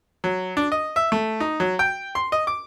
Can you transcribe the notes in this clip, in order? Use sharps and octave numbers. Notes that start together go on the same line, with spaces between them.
F#3
D4
D#5
E5
A3
D#4
F#3
G5
C6
D#5
D6